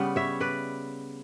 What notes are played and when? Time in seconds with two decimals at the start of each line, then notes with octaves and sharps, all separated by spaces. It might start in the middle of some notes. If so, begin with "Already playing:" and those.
Already playing: C#3 G3 B3
0.16 C#5 E5
0.40 B4 D5